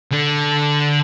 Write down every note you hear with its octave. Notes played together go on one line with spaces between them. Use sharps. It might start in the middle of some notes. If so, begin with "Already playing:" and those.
D3 A4